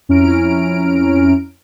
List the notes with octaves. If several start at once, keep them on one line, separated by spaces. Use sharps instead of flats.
F2 C#4 E4 A#5 F6 D7